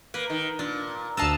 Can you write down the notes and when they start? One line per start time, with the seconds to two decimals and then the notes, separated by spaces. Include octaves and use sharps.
0.14 A#3 B4
0.30 D#3
0.59 A#2 D4
1.17 D2 D4 D#5 F5 A5 E6